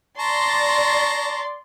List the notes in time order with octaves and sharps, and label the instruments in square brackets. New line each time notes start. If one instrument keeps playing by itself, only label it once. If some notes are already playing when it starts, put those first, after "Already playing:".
[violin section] D5 C6 A6 [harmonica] A5 A#5 C#6